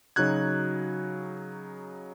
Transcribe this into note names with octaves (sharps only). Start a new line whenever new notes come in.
C#3 F#3 D#4 F#4 F#6 G#6